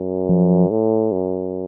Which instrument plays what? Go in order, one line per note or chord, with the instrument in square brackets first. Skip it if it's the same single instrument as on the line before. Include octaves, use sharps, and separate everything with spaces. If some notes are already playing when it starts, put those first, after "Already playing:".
Already playing: [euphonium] F#2
[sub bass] F3
[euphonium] A2
F#2